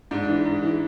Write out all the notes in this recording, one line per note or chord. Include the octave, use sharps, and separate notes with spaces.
G#2 D4
E3
G#2
E3